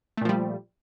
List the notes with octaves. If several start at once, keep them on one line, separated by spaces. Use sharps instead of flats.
A#2 F3 G3 A3